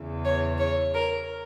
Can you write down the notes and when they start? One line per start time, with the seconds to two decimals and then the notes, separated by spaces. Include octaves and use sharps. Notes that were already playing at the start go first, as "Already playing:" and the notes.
Already playing: E2 C#3 E3
0.25 C#5
0.59 C#5
0.94 A#4